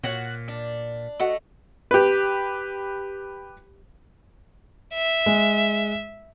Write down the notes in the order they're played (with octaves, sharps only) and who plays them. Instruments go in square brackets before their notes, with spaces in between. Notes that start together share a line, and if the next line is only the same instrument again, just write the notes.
[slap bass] A#2 [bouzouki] F#4 F#5 [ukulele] C#5
[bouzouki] D4
[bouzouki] A3 [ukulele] F#4 F#5 [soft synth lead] D#5
[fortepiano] G4 B4
[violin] E5
[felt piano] G#3